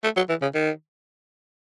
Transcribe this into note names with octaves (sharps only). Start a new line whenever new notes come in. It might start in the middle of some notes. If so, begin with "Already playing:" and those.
A3
F#3
E3
C#3
D#3